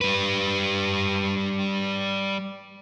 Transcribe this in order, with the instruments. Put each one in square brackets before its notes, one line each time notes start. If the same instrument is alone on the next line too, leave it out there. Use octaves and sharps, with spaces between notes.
[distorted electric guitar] G3 B4